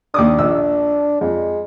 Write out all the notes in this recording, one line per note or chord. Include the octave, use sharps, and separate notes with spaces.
D#2 D4 D6 D#6
A#1 E6
F2 G#3